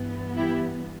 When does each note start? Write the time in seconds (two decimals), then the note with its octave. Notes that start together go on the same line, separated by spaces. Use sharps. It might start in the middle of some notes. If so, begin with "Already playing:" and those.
Already playing: G2 E3 B3
0.37 E4 G4